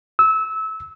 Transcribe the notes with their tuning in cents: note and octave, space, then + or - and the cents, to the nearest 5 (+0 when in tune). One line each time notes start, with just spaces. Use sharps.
E6 -25